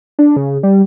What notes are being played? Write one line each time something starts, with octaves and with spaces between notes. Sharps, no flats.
D4
C#3
G3